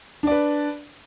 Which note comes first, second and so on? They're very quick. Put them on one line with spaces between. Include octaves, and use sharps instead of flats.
D4 D5 B4